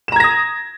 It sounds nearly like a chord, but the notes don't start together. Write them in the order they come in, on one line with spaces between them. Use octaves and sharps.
E7 A#5 G#6 A#6 D#6